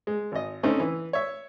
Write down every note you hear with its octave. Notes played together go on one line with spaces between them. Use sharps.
G#3
G#1 D#5
D3 A3 C4 C#4 D#4
E3
C#5 E5